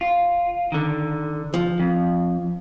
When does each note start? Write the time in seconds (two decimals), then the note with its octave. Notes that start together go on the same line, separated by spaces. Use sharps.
0.01 F4
0.72 D3 D#3
1.54 F3
1.80 F2